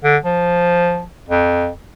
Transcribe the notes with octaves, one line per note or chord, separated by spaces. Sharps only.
D3
F3
F2